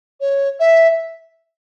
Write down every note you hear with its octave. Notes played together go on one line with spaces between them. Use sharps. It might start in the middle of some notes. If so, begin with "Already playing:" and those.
C#5
E5